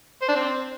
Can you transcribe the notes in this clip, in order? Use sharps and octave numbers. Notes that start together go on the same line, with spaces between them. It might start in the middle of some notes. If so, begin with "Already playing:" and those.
C5
D4
C4